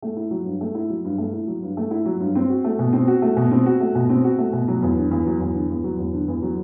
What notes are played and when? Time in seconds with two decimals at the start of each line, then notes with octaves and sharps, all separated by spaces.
0.02 A3
0.17 E4
0.31 F#3
0.46 G2
0.61 A3
0.75 E4
0.90 F#3
1.05 G2
1.18 A3
1.33 E4
1.48 F#3
1.63 G2
1.77 A3
1.91 E4
2.05 F#3
2.20 G2
2.35 C4
2.50 F#4
2.64 A3
2.79 B2
2.93 C4
3.08 F#4
3.22 A3
3.37 B2
3.51 C4
3.66 F#4
3.81 A3
3.95 B2
4.09 C4
4.24 F#4
4.38 A3
4.53 B2
4.68 F#3
4.83 E2
4.97 D3
5.11 E2
5.26 F#3
5.40 E2
5.55 D3
5.70 E2
5.84 F#3
5.98 E2
6.13 D3
6.28 E2
6.42 F#3